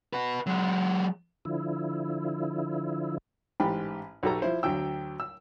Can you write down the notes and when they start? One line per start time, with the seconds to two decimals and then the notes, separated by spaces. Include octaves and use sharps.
0.13 F#4 B4
0.46 F#3 G#3
1.45 D3 F3 E4
3.60 A1 G#2 G4 B5
4.23 B1 F#4 G4 A4 A#5
4.42 F3 E4 C5
4.63 D2 D3 F#3 G5 E6
5.20 E6